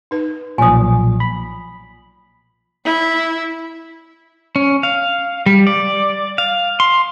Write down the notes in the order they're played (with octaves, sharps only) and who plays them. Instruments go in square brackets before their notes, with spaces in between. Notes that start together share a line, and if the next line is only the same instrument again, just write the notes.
[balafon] D#4 B4
[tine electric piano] B1 A#2 [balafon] F3 [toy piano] G#5 D#6
[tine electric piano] B5
[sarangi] E4
[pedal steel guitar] C#4
F5
G3
D5
F5
C6